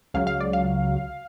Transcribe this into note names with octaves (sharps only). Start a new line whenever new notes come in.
C#2 C#3 F#3 F5
F5
D5
F5